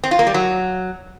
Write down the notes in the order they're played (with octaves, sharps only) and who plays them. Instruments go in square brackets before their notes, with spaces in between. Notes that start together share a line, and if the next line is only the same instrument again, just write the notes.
[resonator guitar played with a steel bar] C4
F4
A#3
G3
F#3